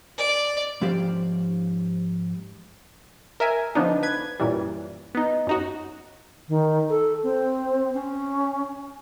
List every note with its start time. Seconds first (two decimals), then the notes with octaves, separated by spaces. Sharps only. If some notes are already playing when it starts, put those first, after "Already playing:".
0.18 D5
0.81 G#2 F3 C#4 G4 C5 F5
3.40 A#4 E5 G#5
3.75 D3 F3 B3 D4 D#4
4.03 B4 G#6
4.40 F#2 A#2 E3 G3
5.15 B3 D#4
5.47 F#2 D#4 F#4
6.48 D#3
6.90 A4
7.23 C4
7.94 C#4